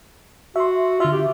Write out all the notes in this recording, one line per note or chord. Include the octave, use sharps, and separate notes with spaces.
F#4 E5 C6
D3 F4 E5
G4